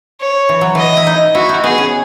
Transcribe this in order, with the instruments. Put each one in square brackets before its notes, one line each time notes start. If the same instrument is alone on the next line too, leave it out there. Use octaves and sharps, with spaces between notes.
[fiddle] C#5
[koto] E3
F#3
[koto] E3 [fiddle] D#5
[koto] E4
D#4
[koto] E4 [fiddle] F#4
[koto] D#4
[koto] B3 [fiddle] G#4
[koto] C#4